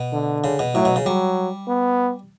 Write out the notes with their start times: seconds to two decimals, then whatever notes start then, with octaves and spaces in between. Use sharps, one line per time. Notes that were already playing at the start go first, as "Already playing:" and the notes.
Already playing: B2
0.13 D3
0.44 C#3
0.59 B2
0.75 A2 F#3
0.85 B2
0.96 C#3
1.06 F#3 G3
1.68 B3